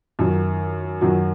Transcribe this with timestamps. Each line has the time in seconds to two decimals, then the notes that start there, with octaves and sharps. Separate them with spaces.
0.19 F#2 D#3 F#3
1.01 F#2 D#3 F#3 F#4